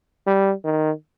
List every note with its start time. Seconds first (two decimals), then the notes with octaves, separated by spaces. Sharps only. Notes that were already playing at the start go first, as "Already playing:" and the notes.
0.27 G3
0.65 D#3